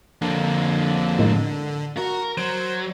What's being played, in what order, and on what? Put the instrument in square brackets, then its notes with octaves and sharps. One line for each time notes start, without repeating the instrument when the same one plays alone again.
[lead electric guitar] F2 A#3 [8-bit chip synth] D3
[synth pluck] A2 D#3 G#3
[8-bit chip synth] F#4 [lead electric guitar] A#4
[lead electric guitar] F#3 [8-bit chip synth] C5 [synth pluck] D7